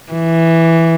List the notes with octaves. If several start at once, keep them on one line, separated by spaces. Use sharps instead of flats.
E3